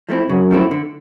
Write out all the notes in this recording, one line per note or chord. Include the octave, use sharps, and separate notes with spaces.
F3 A3 C4 E4
F#2 C#3
F3 A3 C4 E4
D3